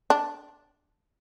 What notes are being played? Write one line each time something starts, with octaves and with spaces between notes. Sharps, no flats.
D4